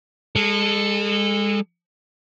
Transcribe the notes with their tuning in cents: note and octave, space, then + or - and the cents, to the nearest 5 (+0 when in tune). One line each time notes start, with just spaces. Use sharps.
G#3 -30 A4 +0